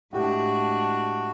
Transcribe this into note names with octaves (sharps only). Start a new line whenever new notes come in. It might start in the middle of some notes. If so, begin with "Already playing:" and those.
A2 G#3 D4 F#4 G4